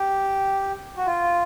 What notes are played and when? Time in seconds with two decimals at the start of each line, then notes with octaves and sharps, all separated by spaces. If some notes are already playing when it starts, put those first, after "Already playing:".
Already playing: G4
0.97 F#4
1.06 F4